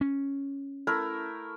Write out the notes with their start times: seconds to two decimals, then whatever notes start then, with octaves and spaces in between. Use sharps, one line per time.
0.01 C#4
0.87 A3 E4 A#4